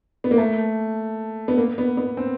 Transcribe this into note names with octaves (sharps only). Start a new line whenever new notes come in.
B3
A#3
A3
B3
A#3
B3
B3
C4